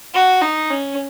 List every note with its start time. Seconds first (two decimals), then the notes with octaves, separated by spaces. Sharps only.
0.14 F#4
0.42 D#4
0.70 C#4